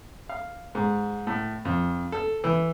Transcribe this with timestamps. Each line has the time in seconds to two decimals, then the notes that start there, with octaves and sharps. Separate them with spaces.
0.29 F5
0.75 G#2
1.27 A2
1.65 F2
2.12 A4
2.44 E3